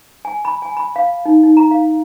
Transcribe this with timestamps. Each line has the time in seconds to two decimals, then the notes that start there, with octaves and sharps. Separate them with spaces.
0.25 G#5
0.45 B5
0.62 G#5
0.77 B5
0.96 F5
1.25 D#4
1.43 D#4
1.57 A#5
1.71 F5